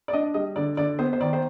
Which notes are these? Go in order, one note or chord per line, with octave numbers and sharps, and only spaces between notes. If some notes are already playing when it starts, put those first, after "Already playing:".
D5
D4 D#5
G3 D#5
D3 D5
D3 D5
B3 C5
C5
D#3 D5
C5